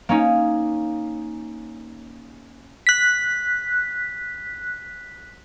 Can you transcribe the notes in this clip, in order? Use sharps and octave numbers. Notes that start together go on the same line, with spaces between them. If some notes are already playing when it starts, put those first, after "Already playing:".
A#3 C#4 D#4
F#6 B6